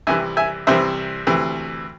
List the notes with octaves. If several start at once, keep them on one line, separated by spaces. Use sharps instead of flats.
C2 C3 E3 E5 G#5
E5 G#5
C2 C3 E3 C5 E5
D2 C3 E3